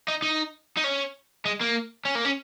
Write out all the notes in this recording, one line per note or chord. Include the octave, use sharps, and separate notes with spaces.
D#4
D#4
D#4
C#4
G#3
A#3
C#4
A#3
C#4